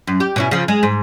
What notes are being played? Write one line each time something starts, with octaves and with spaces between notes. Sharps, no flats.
F#2
G4
B2 C#4 E4
C#3 F3
G#3
G#2